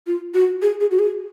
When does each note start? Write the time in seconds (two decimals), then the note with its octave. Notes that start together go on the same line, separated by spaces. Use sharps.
0.07 F4
0.34 F#4
0.62 G#4
0.81 G#4
0.91 F#4
0.99 G#4